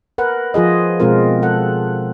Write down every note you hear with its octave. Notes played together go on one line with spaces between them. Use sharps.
A#4 B4 F#5
F3 F4 G#4 D#5
B2 G#3 C4 F4 A#4
A4 F#5